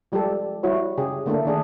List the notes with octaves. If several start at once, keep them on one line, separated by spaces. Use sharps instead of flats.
F3 G3 G#3 G4 A4
G3 E4 F#4 C#5
C#3 G4 G#4
D3 A3 A#3 D4
D#3 D4 G#4